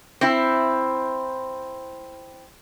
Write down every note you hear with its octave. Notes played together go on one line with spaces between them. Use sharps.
C4 E4